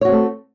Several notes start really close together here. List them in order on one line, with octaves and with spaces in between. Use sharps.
C#5 F#4 C4 A3